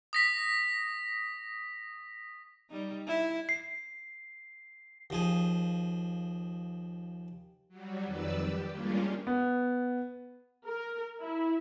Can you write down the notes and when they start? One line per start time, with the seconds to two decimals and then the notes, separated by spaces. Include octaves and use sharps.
0.13 D#6 A#6 B6
2.70 G3 D#4
3.07 E4
3.49 C7
5.10 D#2 F3 G#4
7.69 F#3 G3
8.04 F2 D#3 B4 D5 E6
8.38 G4
8.70 G3 G#3 A#3 C#4 D4 F4
9.27 B3
10.65 A#4
11.20 E4